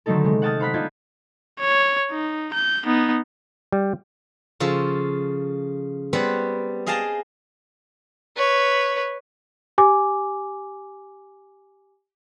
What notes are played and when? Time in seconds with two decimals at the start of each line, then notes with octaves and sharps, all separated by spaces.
0.06 D3 D#3 F#3 A3 D#4 A4
0.24 C3 G#3
0.42 F#5 G5 A5 D#6 F6 A6
0.59 D#4 C5 F5 B5 F#6 B6
0.74 B3 D4 D#4 F4 G6 G#6
1.60 C#5
2.11 D#4
2.54 G6
2.85 B3 D#4
3.72 G3
4.60 C#3 F3 F4 A4
6.13 G3 B3 C4 B4 C#5 F#5
6.86 G#4 D#5 F5 G5 A5 A#5
8.36 B4 C#5
9.78 G4 G#5 D6